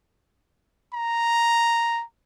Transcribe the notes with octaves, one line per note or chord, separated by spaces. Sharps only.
A#5